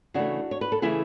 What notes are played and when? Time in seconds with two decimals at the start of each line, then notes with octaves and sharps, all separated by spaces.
0.14 C#3 E3 A3 D4 F#4
0.51 C#5
0.61 B4
0.72 A4
0.82 C#3 E3 A3 E4 G#4